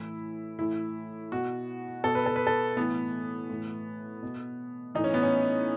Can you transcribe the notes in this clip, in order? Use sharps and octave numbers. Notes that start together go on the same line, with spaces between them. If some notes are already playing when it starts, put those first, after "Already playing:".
Already playing: A2 E3 E4
A2 E3 E4
B2 F#4
B2 A4
B4
A4
B4
A4
A2 E3 B3
A2 E3
B2
A2 E3 D#4
C#4
B3
C#4